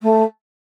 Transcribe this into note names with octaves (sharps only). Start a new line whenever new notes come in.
A3